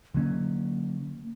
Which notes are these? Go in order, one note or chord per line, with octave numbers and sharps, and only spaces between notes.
D3 F#3 A#3 C#4